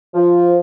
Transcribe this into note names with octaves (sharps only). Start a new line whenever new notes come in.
F3